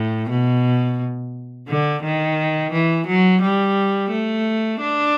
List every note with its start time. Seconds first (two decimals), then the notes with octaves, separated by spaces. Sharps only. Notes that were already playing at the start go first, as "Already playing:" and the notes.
Already playing: A2
0.29 B2
1.68 D3
2.03 D#3
2.72 E3
3.07 F#3
3.42 G3
4.11 A3
4.80 D4